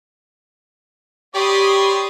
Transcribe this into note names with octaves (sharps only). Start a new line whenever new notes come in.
G4 C#5 D5 B5 C6 D#6